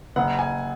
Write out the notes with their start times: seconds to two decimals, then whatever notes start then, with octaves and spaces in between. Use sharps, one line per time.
0.16 F#1 F#5
0.39 G#5